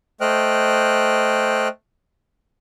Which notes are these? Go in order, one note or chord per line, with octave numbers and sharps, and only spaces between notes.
A3 C5 D#5 G5 F6 F#6